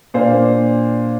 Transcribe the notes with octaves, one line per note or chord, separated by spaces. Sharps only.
A#2 A#3 D4 C5